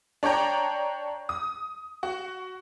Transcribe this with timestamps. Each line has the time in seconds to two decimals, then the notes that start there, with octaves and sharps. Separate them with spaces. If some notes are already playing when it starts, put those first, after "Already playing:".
0.23 D4 C#5 D5 G5 A#5
1.29 D#6
2.03 F#4